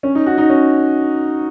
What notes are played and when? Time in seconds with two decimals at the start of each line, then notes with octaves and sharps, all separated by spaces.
0.03 C#4
0.15 D#4
0.26 F#4
0.38 D#4
0.50 C#4